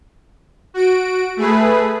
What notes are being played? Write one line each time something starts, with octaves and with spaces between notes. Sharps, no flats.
F#4 D7
A3 G#4 B4